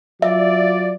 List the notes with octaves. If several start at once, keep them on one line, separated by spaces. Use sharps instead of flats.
F#3 F4 D5 E5